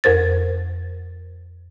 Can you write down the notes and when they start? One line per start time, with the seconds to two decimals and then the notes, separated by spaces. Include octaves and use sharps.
0.04 F2 A#4 C5 A6